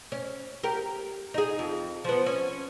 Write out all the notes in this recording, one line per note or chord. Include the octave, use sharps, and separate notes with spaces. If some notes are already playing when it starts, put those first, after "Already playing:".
C#4
G4 A#4
D#4 G#4
F2
F3 B3
C#4